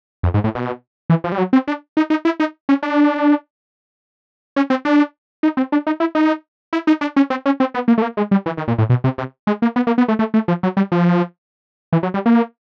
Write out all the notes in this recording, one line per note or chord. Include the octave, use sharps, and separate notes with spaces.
F2
G#2
A2
B2
E3
F3
G3
F#3
C4
D4
D#4
D#4
E4
D#4
C#4
D4
C#4
C4
D4
D#4
C4
D4
D#4
E4
D#4
E4
D#4
D4
C#4
C4
C#4
C4
B3
A#3
A3
A#3
G#3
G3
E3
D#3
A#2
A2
B2
C3
C3
G#3
A#3
B3
A#3
B3
A3
A3
A3
F3
F#3
G3
F3
E3
F#3
G3
A#3